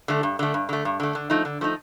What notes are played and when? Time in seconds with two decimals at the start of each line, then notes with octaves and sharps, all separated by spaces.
0.08 D3 A3
0.23 G2
0.39 D3 A3
0.54 G2
0.69 D3 A3
0.85 G2
1.00 D3 A3
1.15 D3
1.30 F3 A3 D#4
1.45 D3
1.61 F3 A3 D#4